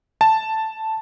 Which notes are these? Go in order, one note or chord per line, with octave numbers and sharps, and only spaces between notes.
A5